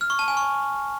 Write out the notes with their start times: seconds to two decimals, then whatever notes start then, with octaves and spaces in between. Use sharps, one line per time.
0.01 F6
0.10 C#6
0.19 A5
0.28 G#5
0.37 C#6